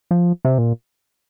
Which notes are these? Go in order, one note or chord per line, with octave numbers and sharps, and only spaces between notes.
F3
C3
A#2